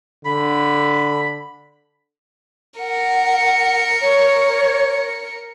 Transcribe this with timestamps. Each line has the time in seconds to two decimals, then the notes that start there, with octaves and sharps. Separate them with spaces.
0.25 D3 B5
2.79 A#4 F#5 C#7
4.01 C#5